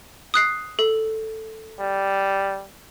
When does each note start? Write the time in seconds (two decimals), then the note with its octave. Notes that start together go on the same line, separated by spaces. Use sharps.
0.34 D#6 F#6 C7
0.79 A4
1.80 G3